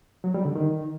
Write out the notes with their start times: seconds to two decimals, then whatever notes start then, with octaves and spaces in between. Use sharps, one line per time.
0.24 F#3
0.34 G3
0.45 D3
0.55 D#3